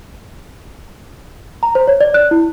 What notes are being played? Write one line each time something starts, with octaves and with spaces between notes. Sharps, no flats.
A#5
C5
C#5
D5
F#6
E4